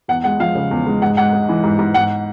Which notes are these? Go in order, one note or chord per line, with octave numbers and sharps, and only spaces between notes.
E2 F#5
G#3 F#5
F3 F5
C#3
E2
G#3
G#2 F#5
G#2 F#5
G#3
E3
G#2
G#2
G#2 F#5